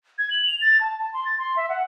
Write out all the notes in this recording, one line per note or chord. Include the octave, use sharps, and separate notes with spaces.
G#6
F#7
F7
A6
A5
A5
C6
A6
C6
E5
F#5